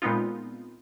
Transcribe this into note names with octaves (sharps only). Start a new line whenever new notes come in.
A#2 G#3 B3 C4 D#4 F4